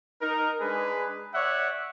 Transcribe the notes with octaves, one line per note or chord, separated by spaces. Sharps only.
D#4 A#4
G#3 D4 G#4 B4
C#5 D5 E5 F#5